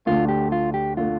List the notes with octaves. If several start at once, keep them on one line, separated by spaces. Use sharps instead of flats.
D2 D3 A3 F4
G4
F4
G4
D3 A3 F4